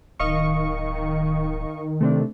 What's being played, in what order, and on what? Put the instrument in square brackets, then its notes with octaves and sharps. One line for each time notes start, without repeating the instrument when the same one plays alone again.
[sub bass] D1 [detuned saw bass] D#3 [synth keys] D#5 F5 C#6
[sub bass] C3 [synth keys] A3 C4 D4